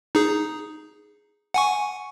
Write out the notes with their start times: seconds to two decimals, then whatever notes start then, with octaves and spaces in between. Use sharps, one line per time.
0.15 D#4 G#4
1.54 F#5 G#5 C#6